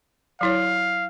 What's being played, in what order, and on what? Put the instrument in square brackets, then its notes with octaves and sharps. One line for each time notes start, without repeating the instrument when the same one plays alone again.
[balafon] F#3 E4 C#5 [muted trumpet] F5